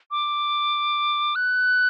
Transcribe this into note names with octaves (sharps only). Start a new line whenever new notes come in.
D6
F#6